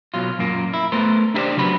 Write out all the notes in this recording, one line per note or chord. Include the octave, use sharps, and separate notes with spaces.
B2 F#3 F4
F#2 A#2 A#3
E4
A3 B3 A#4 C5
D4 E4 G4 B4 C5 D5
C#3 F#3 B3 B5